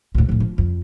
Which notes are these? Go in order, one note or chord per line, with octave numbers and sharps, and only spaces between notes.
D2 A2
A2 F3
F3
F2